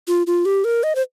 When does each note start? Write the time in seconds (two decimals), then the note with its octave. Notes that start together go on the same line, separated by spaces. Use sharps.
0.08 F4
0.27 F4
0.45 G4
0.64 A#4
0.83 D#5
0.95 C5